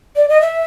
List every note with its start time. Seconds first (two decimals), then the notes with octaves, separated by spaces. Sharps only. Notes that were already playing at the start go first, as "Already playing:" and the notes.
0.16 D5
0.29 D#5
0.41 E5